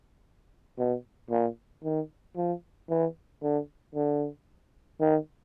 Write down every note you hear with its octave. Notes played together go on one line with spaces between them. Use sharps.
B2
A#2
D#3
F3
E3
D3
D3
D#3